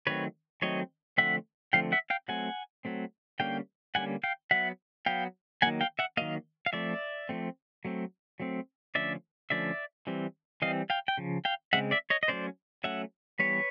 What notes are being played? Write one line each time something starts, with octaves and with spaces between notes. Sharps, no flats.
D#3 F#3 A3 C4 B4 C#5
D#3 F#3 A3 C4 C#5 D#5
D3 F3 A3 C4 E5 F#5
D3 F3 A3 C4 F5 G5
E5 F#5
F5 G5
F#3 A3 C4 F#5 G#5
F#3 A3 C4
D3 G3 A#3 C#4 F5 G5
D3 G3 A#3 C#4 F#5 G#5
F5 G5
F#3 B3 E5 F#5
F#3 B3 F5 G5
D#3 F#3 A#3 F#5 G#5
F5 G5
E5 F#5
D#3 F#3 A#3 D#5 F5
F5
F3 A3 C4 D5 E5
F3 A3 C4
F#3 A3 C4
F#3 A3 C4
D3 F3 A3 C#4 D5 E5
D3 F3 A3 C#4 D5 E5
E3 G3 C4
E3 G3 C4 D#5 F5
F5 G5
G5
C#3 F3
F5 G5
C#3 F3 G#3 C4 E5 F#5
D5 E5
C#5 D#5
D#5
F#3 A3 C#4 C5 D5
F#3 A3 C#4 E5 F#5
E3 G3 B3 B4 C#5